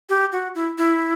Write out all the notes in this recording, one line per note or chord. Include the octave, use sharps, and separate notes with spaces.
G4
F#4
E4
E4